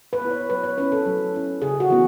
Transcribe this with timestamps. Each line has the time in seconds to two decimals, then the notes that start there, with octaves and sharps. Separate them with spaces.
0.13 B4
0.21 B3 E4
0.31 C#5
0.50 F#3 B4
0.63 C#5
0.78 C#4 E4 B4
0.92 A4
1.06 F#3
1.34 C#4 E4
1.62 C#3 G#4
1.80 F#4
1.90 E3 B3